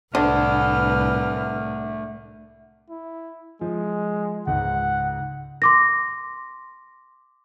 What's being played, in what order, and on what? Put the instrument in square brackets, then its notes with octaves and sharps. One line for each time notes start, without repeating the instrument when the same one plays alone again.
[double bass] C2 A2 [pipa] D3 [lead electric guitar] A3 F#5 [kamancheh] B4 F6
[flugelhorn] E4
[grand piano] F3 [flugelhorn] G#3
[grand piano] C#2 G#2 [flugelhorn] F#5
[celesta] C6 D6 A#6